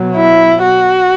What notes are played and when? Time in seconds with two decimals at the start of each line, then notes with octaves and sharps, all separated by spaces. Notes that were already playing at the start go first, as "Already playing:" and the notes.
Already playing: B2 F#3
0.16 E4
0.62 F#4